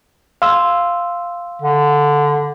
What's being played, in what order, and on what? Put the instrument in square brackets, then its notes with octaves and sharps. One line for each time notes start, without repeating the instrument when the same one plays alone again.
[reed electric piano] F5 C6 E6
[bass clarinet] D3